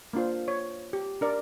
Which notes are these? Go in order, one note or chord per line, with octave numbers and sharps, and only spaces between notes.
A#3 D4 F4 C5
C#5
G4
D4 A#4 D5